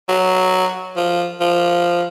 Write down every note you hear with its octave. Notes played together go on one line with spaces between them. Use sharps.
F#3
F3
F3